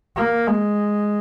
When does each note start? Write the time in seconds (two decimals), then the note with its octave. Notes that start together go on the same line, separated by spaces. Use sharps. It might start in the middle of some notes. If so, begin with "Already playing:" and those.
0.17 A#3
0.47 G#3